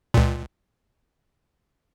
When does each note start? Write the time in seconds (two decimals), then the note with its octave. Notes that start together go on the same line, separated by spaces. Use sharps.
0.14 C#2 A#2